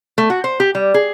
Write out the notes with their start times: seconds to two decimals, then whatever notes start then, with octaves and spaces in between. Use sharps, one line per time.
0.18 A3
0.30 F#4
0.44 C5
0.60 G4
0.75 G3
0.94 G#4